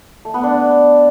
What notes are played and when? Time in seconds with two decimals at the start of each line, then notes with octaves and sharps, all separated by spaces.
0.25 A3
0.34 B3
0.43 D4